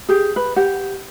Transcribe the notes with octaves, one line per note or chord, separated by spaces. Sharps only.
G4 G#4
B4
G4 F#5